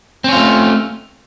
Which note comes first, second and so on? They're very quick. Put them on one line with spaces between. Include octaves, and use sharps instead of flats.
C4 C#4 F4 A3